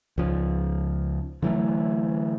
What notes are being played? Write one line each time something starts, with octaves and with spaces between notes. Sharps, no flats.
C#2 F3
D3 E3 F#3 A3